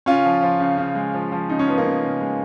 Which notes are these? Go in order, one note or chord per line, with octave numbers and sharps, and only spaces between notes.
C#3 C#4 F4
F3
F3
C#3
C#3
G#3
F3
F3
C#3 D#4
C#4
F3 B3
A#3 C#4
C#3
C#3
G#3